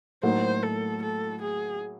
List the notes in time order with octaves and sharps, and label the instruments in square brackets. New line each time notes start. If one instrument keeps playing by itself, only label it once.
[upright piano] A2 F#3 A#3 D#4 F#4 [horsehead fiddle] C5
[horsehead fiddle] A4
A4
G#4